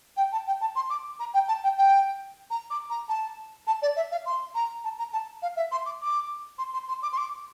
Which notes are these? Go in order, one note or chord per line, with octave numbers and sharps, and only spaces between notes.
G5
A5
G5
A5
C6
D6
A#5
G5
A5
G5
G5
A#5
D6
A#5
A5
A5
D5
E5
F5
C6
A#5
A5
A#5
A5
F5
E5
C6
D6
D6
C6
C6
C6
D6
C6
D6